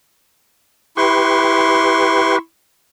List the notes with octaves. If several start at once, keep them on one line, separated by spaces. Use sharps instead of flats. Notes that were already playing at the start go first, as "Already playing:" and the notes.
E4 G4 B4 C6 C#6